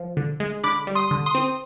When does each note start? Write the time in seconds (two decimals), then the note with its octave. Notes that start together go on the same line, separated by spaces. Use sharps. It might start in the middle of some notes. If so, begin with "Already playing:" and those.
Already playing: F3
0.17 D3
0.40 G#3
0.64 D3 B5 D6
0.87 G3
0.95 C6 D#6
1.11 D3
1.26 C6 D#6
1.35 C4